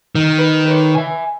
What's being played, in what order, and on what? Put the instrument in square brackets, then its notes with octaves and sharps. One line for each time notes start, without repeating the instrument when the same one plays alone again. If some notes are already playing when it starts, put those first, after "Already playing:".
[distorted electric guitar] D#3
[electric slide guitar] B4
B4 C#5
E5 G#5